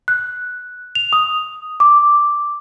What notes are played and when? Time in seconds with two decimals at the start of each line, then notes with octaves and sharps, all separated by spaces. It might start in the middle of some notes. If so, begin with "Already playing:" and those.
0.08 F#6
0.95 F7
1.13 D#6
1.80 D6